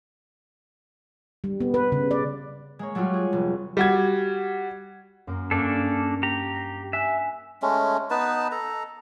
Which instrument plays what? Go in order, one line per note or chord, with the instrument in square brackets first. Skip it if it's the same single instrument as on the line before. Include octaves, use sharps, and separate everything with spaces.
[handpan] G3
B3
B4
C#3
D5
[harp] G#3 A#3 C#5
F#3 G3 A3 F4 F#4
G#4
F1
[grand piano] G3 F#4 G#6
[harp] F#2 A#3
[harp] G2 C#4 [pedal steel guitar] A#3 D4 A4
[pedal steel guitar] G4 A#5
[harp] C7
[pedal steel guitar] E5 [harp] G#5 F#6
[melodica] G#3 A3 C#4
B3 D#4 B4 A5
A4 A#5